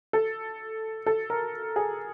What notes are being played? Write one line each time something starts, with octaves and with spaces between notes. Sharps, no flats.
A4
A4
A#4
G#4